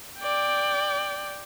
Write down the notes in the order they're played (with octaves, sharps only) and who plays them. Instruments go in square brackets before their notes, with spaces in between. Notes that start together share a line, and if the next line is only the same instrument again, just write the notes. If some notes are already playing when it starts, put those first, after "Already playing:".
[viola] D5 G5